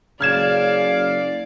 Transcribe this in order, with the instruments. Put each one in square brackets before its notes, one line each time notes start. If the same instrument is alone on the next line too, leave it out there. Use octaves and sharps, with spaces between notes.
[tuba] F#1 [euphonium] C#3 [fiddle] D5 F5 [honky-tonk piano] F6 G#6 E7